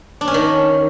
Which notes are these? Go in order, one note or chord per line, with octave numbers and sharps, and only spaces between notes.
D4
C#4
D#3